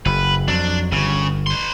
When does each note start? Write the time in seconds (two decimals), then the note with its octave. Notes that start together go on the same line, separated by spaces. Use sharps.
0.06 F#1 B4
0.48 F2 F#3 D4
0.92 G1 C#3
1.47 B4 C6